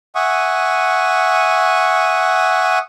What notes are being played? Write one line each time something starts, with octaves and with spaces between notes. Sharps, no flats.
E5 F#5 G#5 C#6 D#6